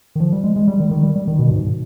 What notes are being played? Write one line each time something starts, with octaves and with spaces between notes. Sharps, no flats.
D#3
F3
G3
G#3
G#3
G3
D#3
D#3
G3
G3
D#3
B2
G#2